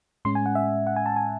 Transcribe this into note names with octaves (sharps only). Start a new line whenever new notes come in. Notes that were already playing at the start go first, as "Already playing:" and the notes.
A2 G#3 C#4 C6
G#5
F#5
E5
F#5
G#5
A5
G#5